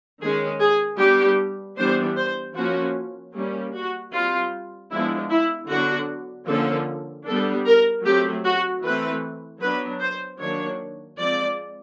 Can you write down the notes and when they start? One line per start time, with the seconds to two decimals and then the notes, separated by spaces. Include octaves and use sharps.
0.20 D#3 G#3 C#4 G#4
0.60 G#4
0.99 G3 B3 D4 G4
1.77 E3 G3 B3 D4 C5
2.17 C5
2.56 F3 A#3 C#4 F#4
3.35 G3 A#3 C#4
3.74 F#4
4.13 G3 C4 F4
4.91 F3 G#3 B3 D4 E4
5.31 E4
5.70 D3 F#3 B3 D4 F#4
6.48 D3 F3 A#3 C#4 A4
7.26 G3 B3 D4 A4
7.66 A#4
8.05 F#3 A3 C4 G4
8.44 F#4
8.83 E3 A3 C4 B4
9.61 F#3 B3 D4 B4
10.01 C5
10.40 D#3 F#3 A#3 D4 C#5
11.18 F3 G#3 C4 D5